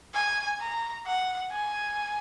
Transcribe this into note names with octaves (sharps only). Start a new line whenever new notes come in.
G#5
A#5
F#5
G#5